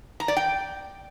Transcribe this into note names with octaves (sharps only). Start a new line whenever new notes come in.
A#5
D5
G5